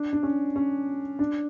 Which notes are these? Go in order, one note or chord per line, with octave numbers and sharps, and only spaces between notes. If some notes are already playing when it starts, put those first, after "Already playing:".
Already playing: D4
D4
C#4
C#4
D4